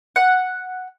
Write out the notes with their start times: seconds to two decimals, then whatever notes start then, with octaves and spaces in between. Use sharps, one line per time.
0.16 F#5